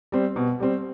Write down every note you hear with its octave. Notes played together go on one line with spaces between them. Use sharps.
G3 C4
B2
G3 C4